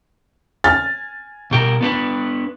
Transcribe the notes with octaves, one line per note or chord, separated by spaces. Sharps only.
G#5 F6 A6
B2 G4 A#4
B3 D4 B4